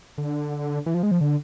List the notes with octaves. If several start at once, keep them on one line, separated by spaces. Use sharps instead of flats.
D3
E3
F3
G#3
F3
D3